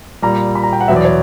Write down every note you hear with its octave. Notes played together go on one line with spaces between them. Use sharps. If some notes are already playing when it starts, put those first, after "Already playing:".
A#2 G3 A#5
B5
A#5
G5
F#5
E2 B2 F#3 E5
D5
C#5